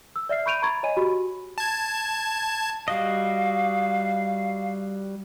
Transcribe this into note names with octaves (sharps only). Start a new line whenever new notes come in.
E6
D5 E5 F6 C7
B5 C#6 G6 D7 D#7 F7
A#5 B5 C#6 G#6 A6
C#5 D#5 G#5 D#7
F#4 G4 B5
A5 G#6
G3 F#4 D#5 F5